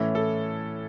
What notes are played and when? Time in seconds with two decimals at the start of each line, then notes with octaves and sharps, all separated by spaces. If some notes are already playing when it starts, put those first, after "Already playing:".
Already playing: A2 E3 A3 C#4 E4
0.15 A4